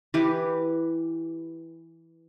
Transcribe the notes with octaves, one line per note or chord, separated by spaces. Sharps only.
E3 G4 B4